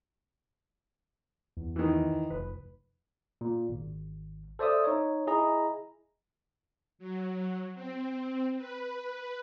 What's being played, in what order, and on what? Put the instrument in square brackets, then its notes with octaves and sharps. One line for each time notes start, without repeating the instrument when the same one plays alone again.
[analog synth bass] E2
[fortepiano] D#3 E3
[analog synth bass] F1 [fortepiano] B4
[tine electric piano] A#2
G#1
A4 C5 D5 E5 D#6 E6
D#4 C#5
E4 G#4 D#5 A#5
[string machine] F#3
C4
B4